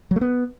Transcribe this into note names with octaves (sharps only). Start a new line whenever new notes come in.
F#3
A3
B3